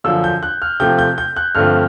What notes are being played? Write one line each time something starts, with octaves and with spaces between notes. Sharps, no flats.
F#2 D3 F3 E6
G6
F#6
F6
C3 F3 A3 C4 G6
G6
G6
F#6
G2 D3 F3 A3 C4 F6